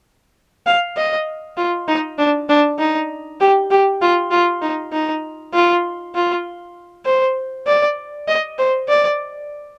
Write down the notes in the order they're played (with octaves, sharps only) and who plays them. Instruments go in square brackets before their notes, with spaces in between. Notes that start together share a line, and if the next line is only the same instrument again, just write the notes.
[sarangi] F5
D#5
F4
D#4
D4
D4
D#4
G4
G4
F4
F4
D#4
D#4
F4
F4
C5
D5
D#5
C5
D5